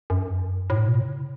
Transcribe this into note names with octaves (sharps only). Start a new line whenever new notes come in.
F#2
A2
B2
C#3